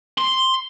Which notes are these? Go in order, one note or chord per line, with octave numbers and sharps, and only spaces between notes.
C6